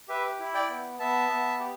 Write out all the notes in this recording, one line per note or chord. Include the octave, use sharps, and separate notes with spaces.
G4 B4 E5
E4
D5 G5
B3
B3 E5 A5
B3
G4